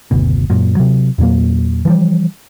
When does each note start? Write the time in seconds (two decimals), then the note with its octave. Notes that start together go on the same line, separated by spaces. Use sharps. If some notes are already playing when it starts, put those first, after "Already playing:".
0.11 F#1 D2 B2
0.50 F#2 A#2
0.77 C3 F#3
1.18 E2 A#2 F#3 A#3
1.85 E3 F3 G3